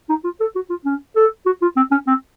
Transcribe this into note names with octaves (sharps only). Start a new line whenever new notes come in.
D#4
F4
A4
F#4
F4
C#4
A4
F#4
F4
C4
C#4
C4